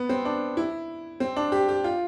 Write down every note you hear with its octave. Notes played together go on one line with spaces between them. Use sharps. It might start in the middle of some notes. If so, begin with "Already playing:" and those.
Already playing: B3
C4
D4
E4
C4
D4
G4
G4
F4